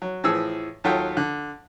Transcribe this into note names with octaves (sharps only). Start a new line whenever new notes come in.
F#3
A2 E3 F3 G#4 E6
D#2 F#3 F4 A4 F#5 G5
D3